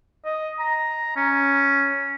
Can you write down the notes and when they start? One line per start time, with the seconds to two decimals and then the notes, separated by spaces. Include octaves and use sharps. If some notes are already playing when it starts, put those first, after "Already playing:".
0.25 D#5
0.59 A#5
1.16 C#4